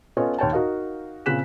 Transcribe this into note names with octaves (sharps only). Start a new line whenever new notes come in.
B3 C#4 F4 A4 C#5 D#5
D#2 C#5 G5 A5
D#4 F#4 A#4 D#5 F5
A#2 C#3 C4 F#6 B6 E7